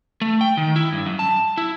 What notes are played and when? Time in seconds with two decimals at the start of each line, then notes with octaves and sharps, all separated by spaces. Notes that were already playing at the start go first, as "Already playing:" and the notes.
0.21 A3
0.41 G5
0.57 D#3
0.76 E4
0.92 G2
1.06 F#2
1.19 A5
1.58 E4